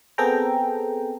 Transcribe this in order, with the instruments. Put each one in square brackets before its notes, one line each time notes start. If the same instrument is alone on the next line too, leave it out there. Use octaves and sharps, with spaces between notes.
[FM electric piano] B3 C4 G#4 A4 G5 A#5